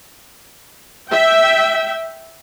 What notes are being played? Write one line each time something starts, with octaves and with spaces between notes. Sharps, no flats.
E5 G5